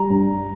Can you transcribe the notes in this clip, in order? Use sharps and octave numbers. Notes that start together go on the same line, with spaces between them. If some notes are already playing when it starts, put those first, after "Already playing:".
Already playing: G3 A#5
G2